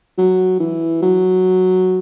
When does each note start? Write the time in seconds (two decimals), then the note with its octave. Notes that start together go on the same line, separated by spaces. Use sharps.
0.18 F#3
0.60 E3
1.02 F#3